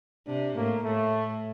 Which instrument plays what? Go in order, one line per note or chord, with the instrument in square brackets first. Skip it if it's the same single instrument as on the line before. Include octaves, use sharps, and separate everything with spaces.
[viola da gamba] C3 [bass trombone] D4
[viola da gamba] A2 [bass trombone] A#3
[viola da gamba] A2 [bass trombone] A3